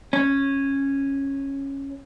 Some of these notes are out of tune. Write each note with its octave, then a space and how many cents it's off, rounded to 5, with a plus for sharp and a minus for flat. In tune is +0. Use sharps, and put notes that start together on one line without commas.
C#4 -10